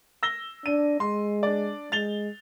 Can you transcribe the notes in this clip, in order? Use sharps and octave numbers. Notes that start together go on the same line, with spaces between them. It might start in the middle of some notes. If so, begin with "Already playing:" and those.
E6 A#6 G7
D4 D#7
G#3 C6
D4 D5
G#3 A6 F7 G7